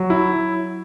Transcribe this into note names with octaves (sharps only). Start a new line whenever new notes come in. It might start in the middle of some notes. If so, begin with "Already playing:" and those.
Already playing: F#3
E4